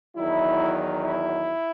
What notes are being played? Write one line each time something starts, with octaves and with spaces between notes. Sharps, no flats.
E2 D#3 F#3 E4
E4